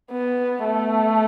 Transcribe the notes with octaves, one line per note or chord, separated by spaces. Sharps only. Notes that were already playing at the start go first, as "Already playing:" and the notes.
B3
A3